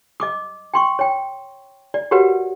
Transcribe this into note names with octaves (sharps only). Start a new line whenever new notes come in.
D#5 D6 D#6
G5 C6 C#6
C#5 G5
D5
F#4 G4 A#4 B4 C#5 F#5